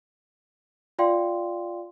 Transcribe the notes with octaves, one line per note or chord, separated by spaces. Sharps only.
F4 D5 F5 G5 C6